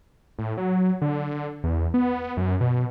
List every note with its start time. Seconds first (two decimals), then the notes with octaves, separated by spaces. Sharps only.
0.39 A2
0.58 F#3
1.02 D3
1.64 E2
1.94 B3
2.37 F#2
2.61 B2